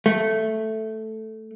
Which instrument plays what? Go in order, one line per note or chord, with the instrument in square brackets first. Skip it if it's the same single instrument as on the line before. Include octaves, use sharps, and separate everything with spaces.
[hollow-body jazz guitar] A3